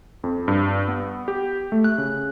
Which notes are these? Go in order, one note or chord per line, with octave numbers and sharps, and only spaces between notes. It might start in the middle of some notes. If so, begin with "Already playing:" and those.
F2
G2
B3
G4
A3
F#6
C#3